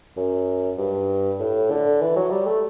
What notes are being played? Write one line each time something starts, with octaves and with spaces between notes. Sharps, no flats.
F#2
G2
A2
D3
E3
F#3
G3
A3